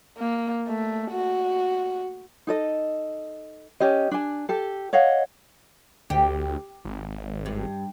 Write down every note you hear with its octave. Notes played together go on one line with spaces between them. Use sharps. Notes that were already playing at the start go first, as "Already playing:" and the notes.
A#3
A3
F#4
D#4 A4 D#5
C#4 G4 D#5
D4 G#5
G4 A4
C#5 D#5 F5 F#5
D2 G4
G#1
G2